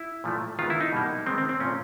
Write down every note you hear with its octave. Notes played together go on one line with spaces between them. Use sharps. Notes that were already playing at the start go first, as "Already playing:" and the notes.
Already playing: E4
A#2 F3 A3
D#3 G#3 B3 F4
E4
D#4
B2 G3 A#3
D#3 G#3 B3 C4
C4
C4
A#2 F3 A3 C#4